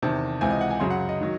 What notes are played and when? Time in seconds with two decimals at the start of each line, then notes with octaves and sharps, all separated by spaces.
0.02 E2 C3 D#3 A5
0.41 C#2 C3 E3 G#5
0.51 D#5
0.61 F#5
0.71 G#5
0.80 F#2 C#3 F#3 C6
0.90 F#5
1.09 D#5
1.21 D#3 F#3